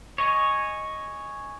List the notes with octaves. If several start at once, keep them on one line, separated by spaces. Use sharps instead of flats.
C#5 D#5 G#5